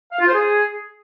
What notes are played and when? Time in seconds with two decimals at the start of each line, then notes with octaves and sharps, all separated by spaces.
0.12 F5
0.19 F4
0.26 C5
0.34 G#4